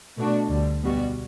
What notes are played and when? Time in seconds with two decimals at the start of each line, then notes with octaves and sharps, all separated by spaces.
0.18 B2 A3 D4 F#4
0.50 D2 D3 G3
0.82 B1 B2 G3 B3 F#4